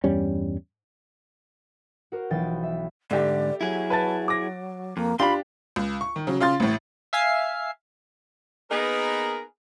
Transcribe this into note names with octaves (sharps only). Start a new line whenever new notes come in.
E2 G2 G3 C#4
F#4 A#4 C5
B1 E3 F3 G5 A6 D7
E5
G#2 D3 A3 G4 D5
F#3 E4 G#4
B4 A5 A6
D6 A#6
F2 A#3
D4 F4 G4 F5 B5 C6
C#2
C#6
D#3
C#3 F#3
C#3 F4 F5 C6 F6 A6
A1 A2
E5 F5 G#5 C7
A#3 B3 D#4 G#4 A#4 B4